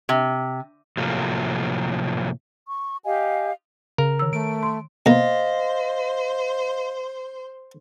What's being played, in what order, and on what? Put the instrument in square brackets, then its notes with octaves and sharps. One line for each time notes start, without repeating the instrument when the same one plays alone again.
[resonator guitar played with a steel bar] C3
[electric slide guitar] A2 C3 F3 F#3 A3 A#3
[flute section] C#6
G4 D#5 F5 G#5
[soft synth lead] C#3 [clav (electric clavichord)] A#4
[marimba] D#3 E6
[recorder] A3 [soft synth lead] D7
[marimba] C6
[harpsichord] B2 A#3 [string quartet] C5 [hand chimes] D#5 F5 A#6